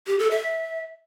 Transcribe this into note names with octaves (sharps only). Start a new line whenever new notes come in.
G4
A4
E5